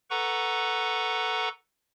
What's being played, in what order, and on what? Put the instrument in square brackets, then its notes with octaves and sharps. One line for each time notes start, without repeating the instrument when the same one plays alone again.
[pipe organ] A4 B4 F#5 A#5 C#6